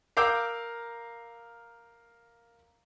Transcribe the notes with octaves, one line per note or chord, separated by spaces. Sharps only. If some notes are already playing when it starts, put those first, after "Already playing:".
A#4 F5 A#5 D6 E6 G6